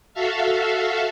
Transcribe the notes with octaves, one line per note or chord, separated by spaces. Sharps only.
F#4 A4 E5 F5